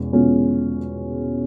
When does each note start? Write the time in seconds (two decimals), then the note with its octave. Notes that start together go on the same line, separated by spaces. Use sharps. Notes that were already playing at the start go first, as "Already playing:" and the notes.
Already playing: E2 B2 G#3 C#4
0.13 E2 B2 G#3 C#4 F4